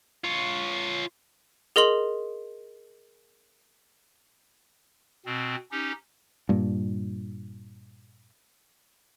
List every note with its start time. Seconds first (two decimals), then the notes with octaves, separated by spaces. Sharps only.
0.24 F4 C#5
1.76 G#4 A#4 D#5 C6 F#7
5.26 B2 C4
5.72 C#4 D#4 G4
6.49 G2 A#2